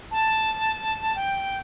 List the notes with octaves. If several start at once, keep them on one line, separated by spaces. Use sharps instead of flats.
A5
G5